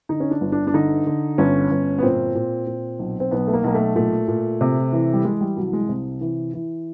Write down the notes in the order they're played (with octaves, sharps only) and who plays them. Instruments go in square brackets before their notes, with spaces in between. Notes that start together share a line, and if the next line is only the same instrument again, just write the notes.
[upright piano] D3 D#4
C#4
D4
G1
D4
D4
D3 D#4
D3
G1 C#4
G1
B3
A#2 C4
A#2
A#2
B1
C4
B1 B3
A3
A#3
B1 A#3
A3
A#2 A3
A#2
C3
E3
G3
E3 G#3
G3
C2 F#3
G#3
C3
E3
E3